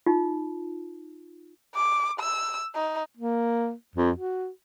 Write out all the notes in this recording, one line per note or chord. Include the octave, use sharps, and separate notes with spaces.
D#4 F4
D6
E6
D#4
A#3
F2
F#4